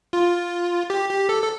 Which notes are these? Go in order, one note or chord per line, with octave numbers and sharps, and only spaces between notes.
F4
G4
G4
A4
A4